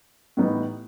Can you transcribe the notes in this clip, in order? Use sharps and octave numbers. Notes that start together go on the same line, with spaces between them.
A2 E3 G3 B3 D#4